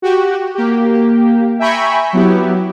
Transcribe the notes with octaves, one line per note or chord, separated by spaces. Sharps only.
F#4 G4
A#3 G4
E5 G5 G#5 A#5 B5 C#6
F#3 B3 E4 G4